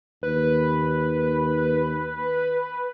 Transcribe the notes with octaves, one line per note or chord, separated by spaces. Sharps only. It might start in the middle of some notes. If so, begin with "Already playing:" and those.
D#2 B4